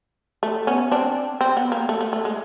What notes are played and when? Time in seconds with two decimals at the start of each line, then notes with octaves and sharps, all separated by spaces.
0.43 A3
0.67 B3 C#4
0.91 C4 D4
1.41 C4
1.57 B3
1.72 A#3
1.89 A3
2.01 A3
2.13 A3
2.25 G#3